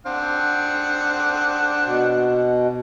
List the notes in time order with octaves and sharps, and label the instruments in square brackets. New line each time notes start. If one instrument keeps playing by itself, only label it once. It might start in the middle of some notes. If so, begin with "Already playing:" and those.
[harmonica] C4 D4 F#5
[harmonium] B2